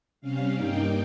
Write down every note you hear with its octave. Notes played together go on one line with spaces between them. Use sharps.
C3 G3 C#4 F5
G2 G3 A#3 D#4 G5